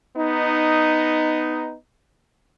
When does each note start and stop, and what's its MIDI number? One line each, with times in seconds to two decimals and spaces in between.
0.17 1.75 59
0.17 1.75 63